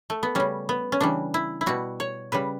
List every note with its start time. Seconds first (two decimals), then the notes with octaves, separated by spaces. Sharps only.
0.10 A3
0.23 B3
0.35 C#3 G3 C#4
0.69 B3
0.92 C#4
1.01 C#3 E3 G3 D4
1.34 E4
1.61 E4
1.66 B2 G3 F#4
2.00 C#5
2.32 C#3 G3 B4